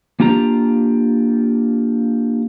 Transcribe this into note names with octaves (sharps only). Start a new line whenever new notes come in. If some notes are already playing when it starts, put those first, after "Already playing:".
A#3 D4 F4 G4 A#5